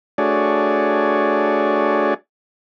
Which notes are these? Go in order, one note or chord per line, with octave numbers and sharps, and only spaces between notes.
A3 D4 F#4 G#4 C#5 D5